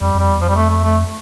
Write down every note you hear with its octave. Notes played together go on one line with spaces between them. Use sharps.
F2 G3
F2 G3
E2
F2 F3
G3
A3
A3
A3